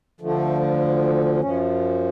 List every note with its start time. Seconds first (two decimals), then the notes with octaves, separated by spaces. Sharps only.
0.21 D2 D3 F3 A3
1.40 F#2 F3 C#4